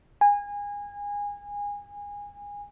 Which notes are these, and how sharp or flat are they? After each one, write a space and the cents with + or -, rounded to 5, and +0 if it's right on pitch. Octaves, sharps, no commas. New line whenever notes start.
G#5 -25